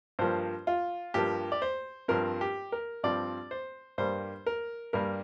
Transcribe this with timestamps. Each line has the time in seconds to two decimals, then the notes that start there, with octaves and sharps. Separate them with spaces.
0.19 G2 F3 A#3 C5
0.67 F4
1.14 G2 F3 A#3 G4
1.52 D5
1.62 C5
2.08 G2 F3 C4 A#4
2.41 G4
2.72 A#4
3.03 G2 F3 C4 D5
3.51 C5
3.98 G2 G3 A#3 C5
4.46 A#4
4.93 G2 G3 A#3 A#4